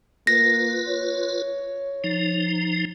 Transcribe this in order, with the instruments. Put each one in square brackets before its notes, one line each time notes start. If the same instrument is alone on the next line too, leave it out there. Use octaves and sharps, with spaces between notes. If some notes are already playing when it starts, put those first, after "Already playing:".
[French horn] A#3 [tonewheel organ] F4 B4 [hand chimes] A#6
[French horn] C#5
[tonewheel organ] F3 D#4